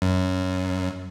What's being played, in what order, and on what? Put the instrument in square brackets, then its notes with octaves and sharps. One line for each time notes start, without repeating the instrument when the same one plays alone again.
[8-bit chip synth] F#2